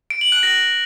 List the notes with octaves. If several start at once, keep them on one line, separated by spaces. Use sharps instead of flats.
D7
F#7
F#6
A#6